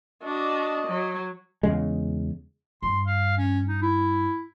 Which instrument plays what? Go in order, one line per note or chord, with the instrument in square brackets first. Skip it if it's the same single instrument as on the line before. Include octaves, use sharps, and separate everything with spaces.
[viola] D4 F#4 [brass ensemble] D5 D#5
[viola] F#3
[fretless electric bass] E2 C#3 G#3
[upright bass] G2 [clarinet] C6
[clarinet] F5
C#4
D#4
E4